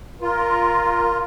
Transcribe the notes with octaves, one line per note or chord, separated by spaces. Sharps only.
F4 A#4